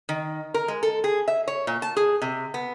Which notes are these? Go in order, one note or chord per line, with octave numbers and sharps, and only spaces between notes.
D#3
A#4
G#3
A4
G#4
E5
C#5
A#2
A5
G#4
C3
B3